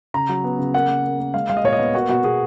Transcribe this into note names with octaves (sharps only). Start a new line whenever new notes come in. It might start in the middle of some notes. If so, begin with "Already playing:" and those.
C#3 A#5
F#3
B3
C#3
A#3 F#5
A#3
A#3
A#3
G#3 F5
G#3 F5
D#5
A#2 C#5
D#5
B3
A#3 F#4
B2 F#4
B2 G#4